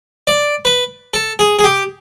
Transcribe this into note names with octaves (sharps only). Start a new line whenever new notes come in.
D5
B4
A4
G#4
G#4
G4